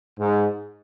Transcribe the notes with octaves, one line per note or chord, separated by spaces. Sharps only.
G#2